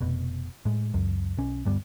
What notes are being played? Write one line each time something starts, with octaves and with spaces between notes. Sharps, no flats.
F1 B2
A2 G#3
C#2 F#2
B1 C#4
D2 G2 G3 B3